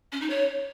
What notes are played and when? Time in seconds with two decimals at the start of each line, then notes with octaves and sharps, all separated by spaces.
0.12 C#4
0.21 D#4
0.30 C#5